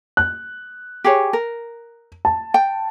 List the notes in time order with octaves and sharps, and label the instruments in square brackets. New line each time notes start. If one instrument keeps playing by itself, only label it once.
[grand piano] F#6
[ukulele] G4 G#4 C#5
A#4
[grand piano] A5
[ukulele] G5